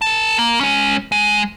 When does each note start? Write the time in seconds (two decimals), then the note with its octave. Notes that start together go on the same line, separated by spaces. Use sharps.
0.02 A#4 A5
0.38 A#3
0.61 G#3 C#4
1.12 G#3